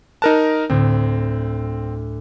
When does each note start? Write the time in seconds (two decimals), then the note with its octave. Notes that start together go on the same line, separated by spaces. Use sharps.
0.22 D#4 A#4 A5 F#6
0.70 D2 A2 C4